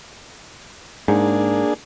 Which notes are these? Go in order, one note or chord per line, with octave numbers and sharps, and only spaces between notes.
G#2 A#3 D4 G#4